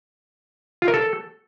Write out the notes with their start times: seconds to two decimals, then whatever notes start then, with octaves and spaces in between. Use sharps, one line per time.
0.82 F4
0.88 A#4
0.94 A4